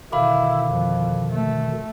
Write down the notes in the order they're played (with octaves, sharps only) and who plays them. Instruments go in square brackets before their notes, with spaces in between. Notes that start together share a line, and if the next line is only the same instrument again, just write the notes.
[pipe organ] B2 D3 D#3 [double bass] E4 [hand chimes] F5 B5 D6
[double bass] F2
A3